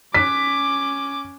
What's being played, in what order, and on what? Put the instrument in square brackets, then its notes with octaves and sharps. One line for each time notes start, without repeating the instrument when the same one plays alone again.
[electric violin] C#4 D6 [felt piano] B6